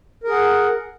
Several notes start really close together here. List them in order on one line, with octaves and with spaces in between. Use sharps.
A#4 G#4 F#5